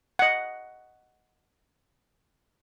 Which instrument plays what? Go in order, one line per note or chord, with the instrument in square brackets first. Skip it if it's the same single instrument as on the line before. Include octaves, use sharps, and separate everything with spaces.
[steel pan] D#5 F#5